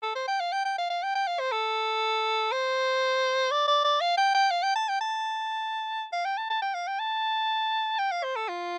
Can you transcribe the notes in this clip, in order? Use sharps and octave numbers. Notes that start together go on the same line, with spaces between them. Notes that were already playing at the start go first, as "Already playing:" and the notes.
A4
C5
G5
F5
G5
G5
F5
F5
G5
G5
F5
C5
A4
C5
D5
D5
D5
F5
G5
G5
F5
G5
A5
G5
A5
F5
G5
A5
A5
G5
F5
G5
A5
G5
F5
C5
A4
F4